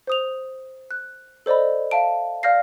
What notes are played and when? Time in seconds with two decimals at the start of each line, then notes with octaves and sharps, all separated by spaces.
0.07 C5 D#6 F7
0.91 F#6
1.46 A4 C5 D5 D#5 B5
1.91 E5 F5 A5 D7
2.43 D5 F5 F6 G6 A#6 C7